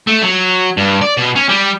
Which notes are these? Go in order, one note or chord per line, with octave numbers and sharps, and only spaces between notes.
A3
F#3
G2
D5
B2
C#4
G3